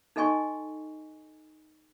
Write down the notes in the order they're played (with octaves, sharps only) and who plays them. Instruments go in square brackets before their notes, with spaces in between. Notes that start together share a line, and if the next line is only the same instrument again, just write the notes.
[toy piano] D#4 A4 D#5 G#5 C6 C#6